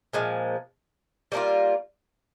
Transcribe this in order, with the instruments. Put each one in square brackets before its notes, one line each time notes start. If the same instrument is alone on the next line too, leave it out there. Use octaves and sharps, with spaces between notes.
[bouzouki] A#2 F3 G#3
G3 A#3 D4 F4